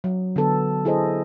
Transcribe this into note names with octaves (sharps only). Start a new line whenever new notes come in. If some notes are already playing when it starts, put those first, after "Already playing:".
F#3
D3 B3 A4
E4 G#4 A4 C5 D#5